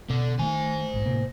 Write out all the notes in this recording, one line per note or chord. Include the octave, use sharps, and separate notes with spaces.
B2 D4 A4
D#3 G3 A3 C5 G#5
A#1 G#2
A2 C3 A#3